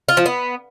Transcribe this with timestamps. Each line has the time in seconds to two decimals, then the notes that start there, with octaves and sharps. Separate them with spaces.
0.09 F4
0.17 F3
0.26 B3